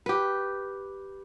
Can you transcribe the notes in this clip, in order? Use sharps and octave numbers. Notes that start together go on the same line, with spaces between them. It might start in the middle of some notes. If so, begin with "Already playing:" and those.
G4 B4